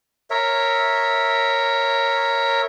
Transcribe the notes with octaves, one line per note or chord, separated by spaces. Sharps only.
A#4 C#5 E5